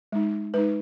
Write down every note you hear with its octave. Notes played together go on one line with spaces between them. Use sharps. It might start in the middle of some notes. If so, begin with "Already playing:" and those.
G#3 D#4
G#3 D#4 B4